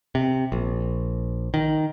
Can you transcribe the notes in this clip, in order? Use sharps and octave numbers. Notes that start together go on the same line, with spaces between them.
C3
A#1
D#3